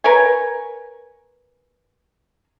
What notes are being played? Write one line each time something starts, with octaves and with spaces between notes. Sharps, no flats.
A#4 B4 C#5 G#5